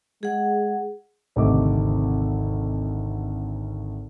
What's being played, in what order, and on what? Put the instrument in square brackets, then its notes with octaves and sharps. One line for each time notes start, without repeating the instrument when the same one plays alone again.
[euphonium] G#3 [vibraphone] G#4 F#5
[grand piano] G#1 D2 C3 A3 D#5 D6